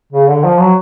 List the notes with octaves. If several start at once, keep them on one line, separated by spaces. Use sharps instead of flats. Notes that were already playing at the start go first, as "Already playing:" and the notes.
C#3
D3
F3
F#3